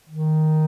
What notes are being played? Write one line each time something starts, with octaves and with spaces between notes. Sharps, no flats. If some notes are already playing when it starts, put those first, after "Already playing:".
D#3